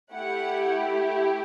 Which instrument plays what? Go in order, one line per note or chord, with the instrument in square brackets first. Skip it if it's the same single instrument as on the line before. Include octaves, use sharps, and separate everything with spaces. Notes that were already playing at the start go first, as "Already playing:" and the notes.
[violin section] A3 E4 G4 F#5